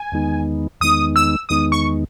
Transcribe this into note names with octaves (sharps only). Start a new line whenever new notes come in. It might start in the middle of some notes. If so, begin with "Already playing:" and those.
Already playing: G#5
E2 D#3 G#3 B3 D#4
E2 D#3 G#3 B3 D#4 D#6
E6
E2 D#3 G#3 B3 D#4 D#6
C#6